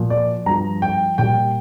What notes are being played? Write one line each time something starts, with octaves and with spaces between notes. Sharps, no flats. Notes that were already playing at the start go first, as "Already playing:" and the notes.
Already playing: A#2 F3
D5
G2 F3 A#5
G5
A#2 G3 G5